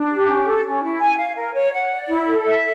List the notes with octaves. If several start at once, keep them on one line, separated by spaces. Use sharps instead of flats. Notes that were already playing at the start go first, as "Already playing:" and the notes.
Already playing: D4
G4
C#4
A4
C#4
E4
G#5
F5
A#4
C#5
F#5
D5
E4
A4
E5